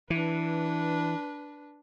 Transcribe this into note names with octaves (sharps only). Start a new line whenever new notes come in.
E3 D4 B4